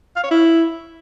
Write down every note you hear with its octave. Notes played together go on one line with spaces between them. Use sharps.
F5
C#5
E4